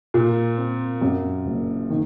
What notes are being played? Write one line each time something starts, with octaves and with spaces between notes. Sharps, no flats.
A#2
C4
F#2
F#1
D#3